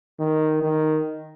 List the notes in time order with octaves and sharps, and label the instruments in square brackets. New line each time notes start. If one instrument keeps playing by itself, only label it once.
[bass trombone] D#3
D#3